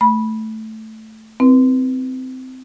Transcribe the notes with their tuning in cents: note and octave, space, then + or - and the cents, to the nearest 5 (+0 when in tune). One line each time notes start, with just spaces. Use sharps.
A3 +0 B5 -15
C4 -20 E4 -25 B4 -15